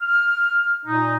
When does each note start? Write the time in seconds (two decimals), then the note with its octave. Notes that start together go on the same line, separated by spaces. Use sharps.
0.01 F6
0.86 A#2 D#4